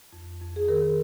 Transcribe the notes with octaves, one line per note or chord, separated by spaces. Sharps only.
F2
F2
G#4
D#3 A#4